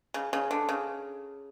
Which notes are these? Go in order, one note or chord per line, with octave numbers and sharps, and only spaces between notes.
C#3
C#3
D3
C#3